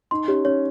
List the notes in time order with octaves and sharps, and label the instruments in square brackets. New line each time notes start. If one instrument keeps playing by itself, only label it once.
[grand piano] D#4 [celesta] C6
[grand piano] C#4 [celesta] G4
[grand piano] C#4 [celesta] C#5